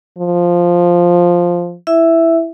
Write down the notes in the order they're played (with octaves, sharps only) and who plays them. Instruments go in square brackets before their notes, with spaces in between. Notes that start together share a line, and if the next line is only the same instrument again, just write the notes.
[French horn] F3
[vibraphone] E4 E5